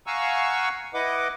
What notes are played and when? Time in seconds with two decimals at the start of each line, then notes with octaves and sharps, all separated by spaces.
0.07 F5 F#5 G#5 A#5 C#6 E6
0.94 E4 B4 D#5 F#5 D6